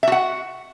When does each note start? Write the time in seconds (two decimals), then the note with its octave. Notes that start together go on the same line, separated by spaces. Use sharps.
0.03 E5
0.07 F#4
0.12 F#5